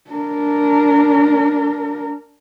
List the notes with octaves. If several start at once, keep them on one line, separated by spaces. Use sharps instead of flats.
D4 A#4